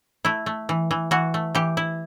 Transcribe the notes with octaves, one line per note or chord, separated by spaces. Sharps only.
A3 E4
A3
E3
E3
E3 F#4
A3
E3 G4
E4